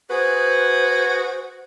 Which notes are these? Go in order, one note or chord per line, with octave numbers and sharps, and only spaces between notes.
F#4 G#4 B4 C5